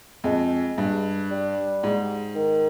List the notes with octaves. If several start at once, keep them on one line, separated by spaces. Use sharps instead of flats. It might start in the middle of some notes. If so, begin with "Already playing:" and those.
F2 G#3
G2
G3
G#2
D#3